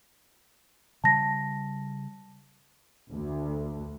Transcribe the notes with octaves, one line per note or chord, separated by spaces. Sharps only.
C#3 G3 A5 A#6
D2